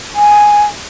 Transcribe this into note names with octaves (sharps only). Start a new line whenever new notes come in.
G#5